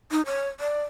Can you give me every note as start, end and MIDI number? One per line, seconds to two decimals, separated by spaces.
0.11 0.22 63
0.26 0.48 73
0.60 0.82 74